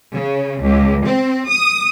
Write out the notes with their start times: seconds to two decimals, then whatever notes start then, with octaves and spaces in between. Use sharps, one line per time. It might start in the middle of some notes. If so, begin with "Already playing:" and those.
0.13 C#3
0.61 C#2
1.04 C4
1.49 D#6